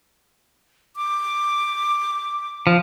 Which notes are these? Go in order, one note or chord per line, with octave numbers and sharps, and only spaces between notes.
D6
F3